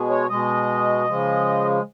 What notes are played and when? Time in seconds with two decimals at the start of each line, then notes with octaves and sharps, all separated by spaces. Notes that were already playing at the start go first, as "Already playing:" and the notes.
Already playing: B2 G#3
0.10 C#5
0.29 B2 G#3 D#5
1.06 C#3 F3 G#3